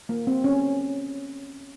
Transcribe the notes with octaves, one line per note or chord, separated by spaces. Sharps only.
A#3
C4
C#4